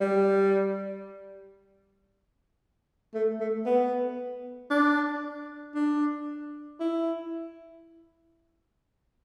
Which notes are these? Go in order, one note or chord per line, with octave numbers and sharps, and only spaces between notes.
G3
A3
A3
B3
D4
D4
E4